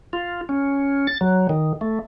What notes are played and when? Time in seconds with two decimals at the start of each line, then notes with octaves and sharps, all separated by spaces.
0.13 F4
0.49 C#4
1.07 A6
1.21 F#3
1.49 D#3
1.81 A3